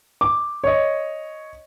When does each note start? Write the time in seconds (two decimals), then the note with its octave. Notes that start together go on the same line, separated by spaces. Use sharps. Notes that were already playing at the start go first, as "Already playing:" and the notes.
0.21 D6
0.64 C#5 D#5